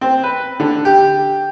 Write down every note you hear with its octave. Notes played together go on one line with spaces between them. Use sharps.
C4
B4
D3
G4